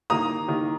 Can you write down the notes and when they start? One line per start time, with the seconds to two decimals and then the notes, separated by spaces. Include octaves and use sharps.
0.10 D#3 A#3 A#5 D#6
0.48 D#3 A#3